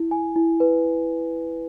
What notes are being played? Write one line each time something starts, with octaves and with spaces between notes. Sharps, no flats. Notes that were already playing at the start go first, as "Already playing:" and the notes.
Already playing: E4
G#5
E4
B4